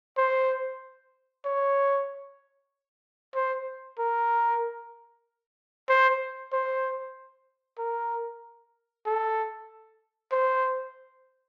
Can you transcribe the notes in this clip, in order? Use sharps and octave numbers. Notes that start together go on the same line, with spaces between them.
C5
C#5
C5
A#4
C5
C5
A#4
A4
C5